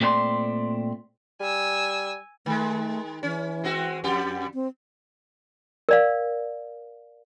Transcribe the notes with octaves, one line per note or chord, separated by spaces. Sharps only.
A#2 A3 C4 A4 D5 C6
G3 G#5 E6
D#3 G#3 A3
E3 C#4
G#3 C4 F#4
F2 G4
C4
A#4 D5 F5